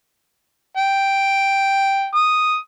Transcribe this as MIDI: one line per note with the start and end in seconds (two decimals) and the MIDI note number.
0.78 2.09 79
2.15 2.57 87